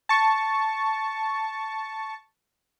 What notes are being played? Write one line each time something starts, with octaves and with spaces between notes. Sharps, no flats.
A5 C#6